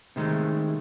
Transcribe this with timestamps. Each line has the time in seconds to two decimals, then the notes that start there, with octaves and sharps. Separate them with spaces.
0.16 C3 D#3 G#3 A3